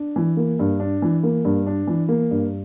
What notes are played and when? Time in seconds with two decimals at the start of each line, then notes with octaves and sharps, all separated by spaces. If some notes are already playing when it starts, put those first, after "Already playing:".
Already playing: D4
0.16 E3
0.37 A#3
0.59 G2
0.80 D4
1.02 E3
1.23 A#3
1.45 G2
1.67 D4
1.87 E3
2.09 A#3
2.31 G2